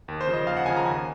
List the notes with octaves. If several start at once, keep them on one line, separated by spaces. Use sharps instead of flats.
D#2
C5
C#3 F3
D#5
D#2 F5
F#5
C#3 F3 G#5
A#5
D#2 G#5